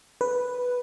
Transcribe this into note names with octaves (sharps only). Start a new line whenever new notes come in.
B4